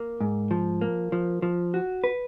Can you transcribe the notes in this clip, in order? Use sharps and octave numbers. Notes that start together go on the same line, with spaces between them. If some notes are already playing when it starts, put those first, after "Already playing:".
Already playing: A#3
G#2
F3
A#3
F3
F3
F#4
B4